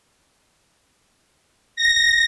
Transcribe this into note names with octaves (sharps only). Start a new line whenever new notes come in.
A#6